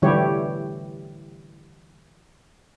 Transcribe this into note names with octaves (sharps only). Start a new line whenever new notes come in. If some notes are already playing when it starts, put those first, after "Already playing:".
D3 E3 G3 E4 G4 C#5